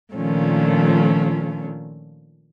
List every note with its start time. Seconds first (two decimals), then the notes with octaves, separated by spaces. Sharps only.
0.14 A#2 D#3 F3 A3 C#4 D4